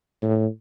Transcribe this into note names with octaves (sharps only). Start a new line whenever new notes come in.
A2